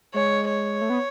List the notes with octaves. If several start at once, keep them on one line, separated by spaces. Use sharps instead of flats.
G#3 C#5
C#5
A3
B3